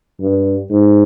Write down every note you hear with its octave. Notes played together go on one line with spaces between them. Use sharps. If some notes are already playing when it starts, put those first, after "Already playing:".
G2
G#2